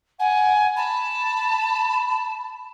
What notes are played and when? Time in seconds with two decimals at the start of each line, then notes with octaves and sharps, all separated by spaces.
0.19 F#5 G#5
0.76 A5 B5